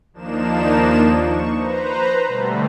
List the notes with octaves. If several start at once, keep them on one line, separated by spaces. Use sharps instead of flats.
D#2 F3 A#3 D4 D#4 E7
C#6
B4 C5 A#5
B2 D3 G3 A3